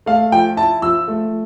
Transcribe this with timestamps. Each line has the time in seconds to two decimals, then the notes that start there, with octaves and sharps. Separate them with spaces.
0.06 A3 F5
0.32 F3 G5
0.57 E4 A5
0.82 F3 E6
1.08 A3